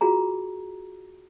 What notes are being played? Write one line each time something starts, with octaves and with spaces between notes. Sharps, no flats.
F4 F#4 G#4 A#5